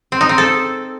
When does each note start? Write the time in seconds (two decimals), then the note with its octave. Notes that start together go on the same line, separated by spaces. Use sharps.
0.12 C4
0.21 D#4
0.29 C4
0.38 A4